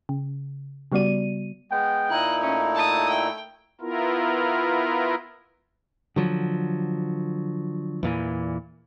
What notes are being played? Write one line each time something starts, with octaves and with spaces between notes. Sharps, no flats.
C#3
C#3 G3 B3 F#4 D5 D#7
G#3 B3 G5
A#2 D#4 E4 D#5 F#6
A3 C#4
A5 D#6
G5
B3 E4 F4 A#4
D3 F3 F#3
E2 A#2 E3